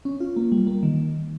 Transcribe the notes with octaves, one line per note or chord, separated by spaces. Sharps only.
C#4
F4
A#3
G3
A#3
D#3